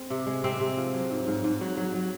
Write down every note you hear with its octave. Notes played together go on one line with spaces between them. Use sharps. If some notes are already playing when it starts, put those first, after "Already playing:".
Already playing: G#3 C4
C3
G#3
C3 C4
C3
F3
F#3
G#2
G#2
G#2
F#3
F#3
F#3